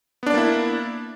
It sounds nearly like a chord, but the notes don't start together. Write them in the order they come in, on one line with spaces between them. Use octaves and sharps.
B3 D4 D5 A#3 E4